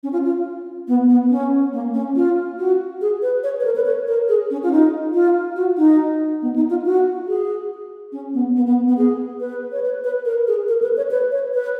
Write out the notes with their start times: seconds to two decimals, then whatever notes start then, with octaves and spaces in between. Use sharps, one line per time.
0.03 C#4
0.13 F4
0.25 F4
0.88 B3
1.09 B3
1.30 C#4
1.73 A#3
1.94 C#4
2.16 F4
2.59 F#4
3.01 G#4
3.22 B4
3.43 C#5
3.60 B4
3.65 A#4
3.76 B4
3.86 C#5
4.08 A#4
4.28 G#4
4.51 C#4
4.63 F4
4.72 D#4
5.14 F4
5.56 F#4
5.78 D#4
6.42 B3
6.56 D#4
6.70 F4
6.85 F#4
7.28 G#4
8.12 C#4
8.34 B3
8.56 B3
8.67 B3
8.88 B3
8.97 G#4
9.40 B4
9.72 C#5
9.83 B4
10.04 B4
10.25 A#4
10.47 G#4
10.68 A#4
10.82 B4
10.97 C#5
11.11 B4
11.32 C#5
11.54 B4